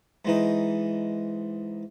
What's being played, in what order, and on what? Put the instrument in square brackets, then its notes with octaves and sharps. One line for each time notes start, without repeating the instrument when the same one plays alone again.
[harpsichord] G#2 E3 D#4